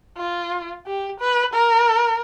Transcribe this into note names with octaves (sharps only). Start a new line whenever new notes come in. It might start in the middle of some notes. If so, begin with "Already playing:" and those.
F4
G4
B4
A#4